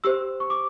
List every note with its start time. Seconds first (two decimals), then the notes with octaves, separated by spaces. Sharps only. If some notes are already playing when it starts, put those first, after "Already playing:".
0.04 G4 C5 E6
0.40 C#6
0.50 D6